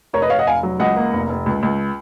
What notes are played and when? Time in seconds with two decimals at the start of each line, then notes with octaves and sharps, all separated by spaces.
0.13 F1 A#4 C#5
0.22 B4 D#5
0.30 F1 C#5 F5
0.39 D#5 F#5
0.47 F1 F5 G#5
0.63 F#3
0.80 C#2 D#5 F#5
0.96 A#3
1.13 F1
1.30 F1
1.46 C#2
1.63 C#2